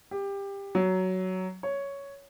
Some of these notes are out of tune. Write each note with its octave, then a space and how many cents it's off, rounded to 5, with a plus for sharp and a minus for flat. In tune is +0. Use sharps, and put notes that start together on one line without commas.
G4 +20
F#3 +10
C#5 +5